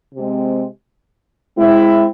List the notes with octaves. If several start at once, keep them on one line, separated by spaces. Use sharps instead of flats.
C3 G#3 C4
G#3 C4 E4